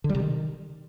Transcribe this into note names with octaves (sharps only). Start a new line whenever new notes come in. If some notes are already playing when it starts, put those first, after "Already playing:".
D3
G3
C3
D#3